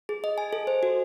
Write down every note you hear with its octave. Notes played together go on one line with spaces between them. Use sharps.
G#4
D#5
G#5
A4
C5
F#4